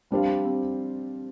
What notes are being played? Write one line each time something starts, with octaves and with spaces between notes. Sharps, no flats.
G3 C4 D4 G4 C5 F5
C4